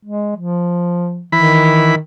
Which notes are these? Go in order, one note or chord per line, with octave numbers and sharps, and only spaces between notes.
G#3
F3
D#3 E3 B5